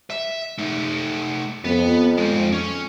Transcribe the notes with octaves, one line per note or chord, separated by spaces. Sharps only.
E5
A3 D#4
F2 B3
G#3 C4
C#4